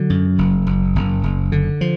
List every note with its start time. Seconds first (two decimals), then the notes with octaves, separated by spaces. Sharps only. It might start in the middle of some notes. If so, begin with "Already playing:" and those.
Already playing: D3 F#3
0.10 F#2
0.38 F#1
0.67 F#1
0.95 F#1
1.23 F#1
1.52 D3
1.81 F3